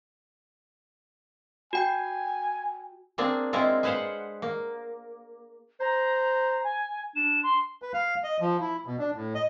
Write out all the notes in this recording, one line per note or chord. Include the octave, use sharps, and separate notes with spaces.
F#4 G5 G#5 G6
A#3 C4 D4 G#4
G#3 A#3 C4 E4 F4
G#4 B4 C5 F5 F#5
A#3
C5 A#5
G#5
D4 E7
C6
B4
F5
D#5
F3
E4
B2
D4
A2
D#5